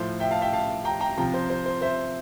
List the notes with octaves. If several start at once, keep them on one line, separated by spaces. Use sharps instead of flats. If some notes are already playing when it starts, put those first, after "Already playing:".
Already playing: A2 F3 C5
E5 G5
F5 A5
E5 G5
F5 A5
G5 A#5
G5 A#5
C3 F3 G5 A#5
C5
C5
C5
C5 E5